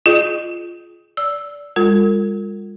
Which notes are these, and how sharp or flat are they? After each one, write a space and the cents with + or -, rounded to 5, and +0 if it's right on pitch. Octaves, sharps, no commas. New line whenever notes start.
F4 -10 G#4 +25 D#5 -25
D5 -20 E6 +0
G#3 -45 F4 +15 A#4 -45